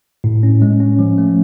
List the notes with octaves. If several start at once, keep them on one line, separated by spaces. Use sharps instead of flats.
A2
C#4
G#3
C#4
F3
A3